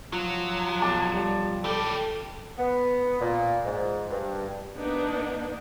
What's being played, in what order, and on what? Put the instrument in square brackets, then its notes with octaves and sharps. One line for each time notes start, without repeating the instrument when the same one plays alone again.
[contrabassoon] F3 [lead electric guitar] F#3
[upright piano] B1 A5 D6
[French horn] G3
[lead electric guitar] E3 G4 [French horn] A4
[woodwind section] B3
A#2
G#2
G2
[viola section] A#3 B3 D4 D#4